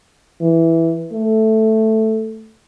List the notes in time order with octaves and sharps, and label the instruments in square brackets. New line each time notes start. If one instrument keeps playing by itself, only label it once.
[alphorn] E3
A3